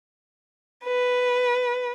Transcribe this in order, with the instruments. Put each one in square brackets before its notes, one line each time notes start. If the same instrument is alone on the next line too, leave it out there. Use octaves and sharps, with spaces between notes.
[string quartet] B4